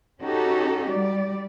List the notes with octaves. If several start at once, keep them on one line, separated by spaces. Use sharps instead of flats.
C#4 D#4 F#4 G4 A4
G3 D5